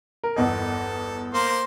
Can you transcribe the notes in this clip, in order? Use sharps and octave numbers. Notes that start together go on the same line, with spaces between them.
A#4
G1 E2 A4 D#5
A#3 C5 C6